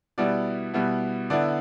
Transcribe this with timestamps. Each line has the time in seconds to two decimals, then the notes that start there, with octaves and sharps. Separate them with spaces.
0.18 B2 G3 B3 E4 D5
0.74 B2 G3 B3 E4
1.30 D3 B3 E4 D5